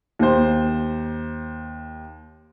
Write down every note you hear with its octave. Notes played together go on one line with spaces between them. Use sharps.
D#2 C5